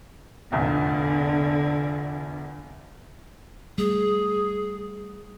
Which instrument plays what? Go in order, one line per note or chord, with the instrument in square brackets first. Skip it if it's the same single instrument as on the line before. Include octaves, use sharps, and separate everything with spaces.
[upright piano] F1 A#1 E2 [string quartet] D3
[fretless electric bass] G3 A3 [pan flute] G#4